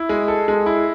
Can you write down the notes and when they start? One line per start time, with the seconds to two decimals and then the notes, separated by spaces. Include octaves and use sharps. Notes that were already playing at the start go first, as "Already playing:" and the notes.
Already playing: E4
0.09 G#3
0.28 A4
0.48 G#3
0.66 E4